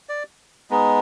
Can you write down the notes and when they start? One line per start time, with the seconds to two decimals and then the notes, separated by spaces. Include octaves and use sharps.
0.09 D5
0.70 G#3 B3 D#4